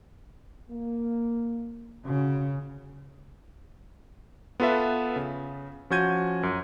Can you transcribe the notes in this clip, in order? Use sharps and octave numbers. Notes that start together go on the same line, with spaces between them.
A#3
C#3 C#4 F#4
B3 F4 A4 B4 E5
C#3
F3 C#4 F#4 G6 G#6 D#7
F#2